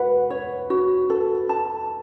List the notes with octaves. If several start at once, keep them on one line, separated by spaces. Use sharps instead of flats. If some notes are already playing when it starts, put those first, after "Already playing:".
Already playing: F#4 B4 F#5
C#5
F#4
A4
A5